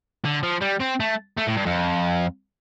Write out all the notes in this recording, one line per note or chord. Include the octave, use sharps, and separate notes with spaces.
D3
F3
G3
C4
A3
A3
A2
G2
F2